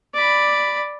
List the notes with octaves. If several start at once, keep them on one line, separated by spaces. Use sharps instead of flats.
D5 B5